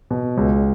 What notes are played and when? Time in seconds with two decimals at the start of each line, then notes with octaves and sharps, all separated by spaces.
0.11 B2
0.37 C#2